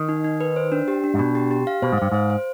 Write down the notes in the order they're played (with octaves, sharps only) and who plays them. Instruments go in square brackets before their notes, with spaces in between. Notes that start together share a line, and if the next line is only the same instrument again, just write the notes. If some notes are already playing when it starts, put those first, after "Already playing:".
Already playing: [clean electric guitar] D#3
[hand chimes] D#4
D#4
B4
C5
D4
G4
D4
[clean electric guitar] G#2
[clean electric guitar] B2 [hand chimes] D4
[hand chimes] G4
G4
F5
[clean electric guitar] B2 [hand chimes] C5
[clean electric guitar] G#2
[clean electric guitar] G2 [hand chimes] F5
[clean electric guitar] G#2 [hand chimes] C5
[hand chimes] C5